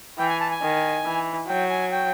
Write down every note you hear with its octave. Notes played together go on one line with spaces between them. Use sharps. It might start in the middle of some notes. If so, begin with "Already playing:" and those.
E3 G5
G#5
A5
G#5
D#3
E3
F#3 G5
G#5
G5